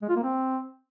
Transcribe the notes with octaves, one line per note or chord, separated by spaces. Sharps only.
G#3
F4
A#3
C4